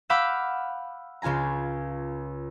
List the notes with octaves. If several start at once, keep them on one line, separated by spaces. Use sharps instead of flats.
F5 F#5 B5 D6 E6 G6
C#2 C#3 F4 G#5 A#5